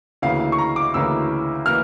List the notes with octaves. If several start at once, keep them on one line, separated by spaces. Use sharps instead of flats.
D2 C#3 E3 A#3 E4 F5
F5
C#6
A#5
D6
D2 C#3 E3 A#3 E4 E6
E3 A#3 E4 F6